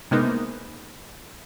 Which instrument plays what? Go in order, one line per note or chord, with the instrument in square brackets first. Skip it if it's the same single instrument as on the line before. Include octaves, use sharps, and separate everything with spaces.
[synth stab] C3 G#3 A#3 B3 D#4